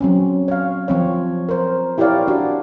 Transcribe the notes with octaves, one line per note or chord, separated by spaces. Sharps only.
F#3 C4 C#4
C#5 F5
F3 C4 C#5
A#4 C5
E4 G4 A#4 C#5 D5 F5
D4 F#4